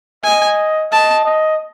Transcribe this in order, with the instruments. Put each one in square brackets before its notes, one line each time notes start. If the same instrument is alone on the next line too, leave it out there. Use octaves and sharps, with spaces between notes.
[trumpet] D#5 [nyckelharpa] G#5
[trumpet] D#5 [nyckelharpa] A5
[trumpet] D#5